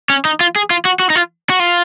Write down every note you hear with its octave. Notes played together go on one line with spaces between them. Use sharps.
C#4
D#4
F4
G#4
F4
F#4
F#4
D#4
F4
F#4
F4